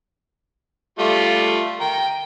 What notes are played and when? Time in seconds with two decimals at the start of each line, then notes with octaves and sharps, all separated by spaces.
0.99 G3 A3 F4
1.80 A#4 G5